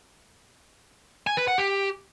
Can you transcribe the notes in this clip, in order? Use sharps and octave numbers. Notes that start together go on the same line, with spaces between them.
G#5
B4
F#5
G4